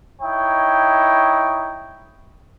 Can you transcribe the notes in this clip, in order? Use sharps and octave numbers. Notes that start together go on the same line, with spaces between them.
D#4 E4 C#5 G5